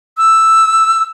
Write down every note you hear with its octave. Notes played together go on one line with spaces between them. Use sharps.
E6